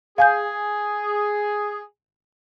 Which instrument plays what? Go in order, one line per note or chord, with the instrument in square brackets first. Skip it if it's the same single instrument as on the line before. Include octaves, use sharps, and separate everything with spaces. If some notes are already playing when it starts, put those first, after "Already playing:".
[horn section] G#4 [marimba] F5 G#5 G6